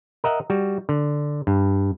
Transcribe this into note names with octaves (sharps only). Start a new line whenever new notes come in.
A#4 D#5 E5 F#5
G3 F#4
D3
G2